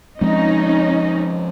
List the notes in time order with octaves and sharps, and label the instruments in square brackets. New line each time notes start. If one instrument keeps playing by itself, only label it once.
[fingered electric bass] F3 G#3 C4 [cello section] C#4 D#4